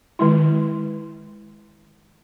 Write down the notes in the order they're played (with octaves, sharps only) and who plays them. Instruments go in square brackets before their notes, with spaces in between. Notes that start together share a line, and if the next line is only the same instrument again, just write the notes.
[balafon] D#3 G#3 E4